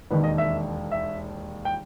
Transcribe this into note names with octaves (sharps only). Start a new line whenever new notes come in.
E1 D#2 D#3 B4
D#5
E5
E5
G5